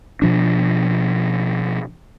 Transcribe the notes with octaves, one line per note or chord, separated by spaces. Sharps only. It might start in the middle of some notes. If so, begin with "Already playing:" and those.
B2 F3 D4